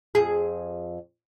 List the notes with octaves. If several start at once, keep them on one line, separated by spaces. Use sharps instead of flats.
F2 G#4